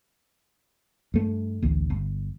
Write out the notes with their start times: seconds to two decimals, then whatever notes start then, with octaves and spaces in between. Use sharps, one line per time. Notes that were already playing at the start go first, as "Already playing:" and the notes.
1.14 G2 A3
1.62 A1 D2
1.90 G1